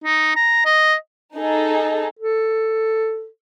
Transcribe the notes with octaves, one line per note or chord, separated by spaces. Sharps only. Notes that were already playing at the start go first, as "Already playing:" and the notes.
D#4
A#5
D#5
D#4 G#4 A4
A4